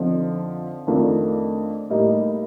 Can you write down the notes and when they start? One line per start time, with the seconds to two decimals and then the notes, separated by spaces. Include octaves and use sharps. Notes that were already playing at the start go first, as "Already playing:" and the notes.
Already playing: F2 D3 F3 C4 D#4
0.87 F2 D#3 A3 D4 F4
1.90 A2 G3 A#3 D#4